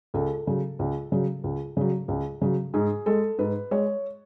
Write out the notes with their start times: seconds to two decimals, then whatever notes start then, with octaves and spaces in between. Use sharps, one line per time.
0.14 C#2 A4
0.47 C#3 F#3
0.79 C#2
1.12 C#3 F#3
1.44 C#2
1.77 C#3 F#3
2.08 C#2
2.41 C#3 F#3
2.74 G#2 G#4
3.06 G#3 A4
3.38 G#2 B4
3.71 G#3 C#5